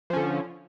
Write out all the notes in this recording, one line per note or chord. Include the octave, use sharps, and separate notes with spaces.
D3 F3 C#4